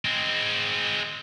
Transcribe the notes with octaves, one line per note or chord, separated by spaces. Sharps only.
G#3 C4